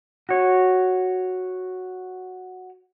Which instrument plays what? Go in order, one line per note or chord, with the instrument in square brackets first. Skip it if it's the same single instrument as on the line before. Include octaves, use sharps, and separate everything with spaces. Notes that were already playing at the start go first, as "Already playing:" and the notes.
[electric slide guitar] F#4 C#5